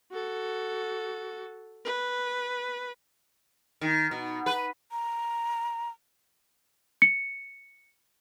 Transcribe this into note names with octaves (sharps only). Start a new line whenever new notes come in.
F#4 A4
B4
D#3
B2
B4
A#5
C#7